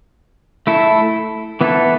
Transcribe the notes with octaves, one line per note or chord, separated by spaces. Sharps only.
A3 E4 A4
E3 B3 E4 A4